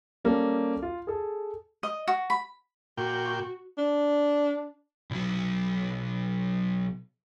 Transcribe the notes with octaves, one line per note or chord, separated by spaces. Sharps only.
G3 A#3 C#4 G4 A4
F4
G#4 A4
D#5
F#4
B5
A#2 F#4 G5
D4
B1 F#3